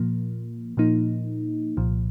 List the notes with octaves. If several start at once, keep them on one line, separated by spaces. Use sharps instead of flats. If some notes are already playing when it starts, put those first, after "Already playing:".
Already playing: A#2 F3 A#3
A#2 F3 A#3 D#4
C2 A#2 F3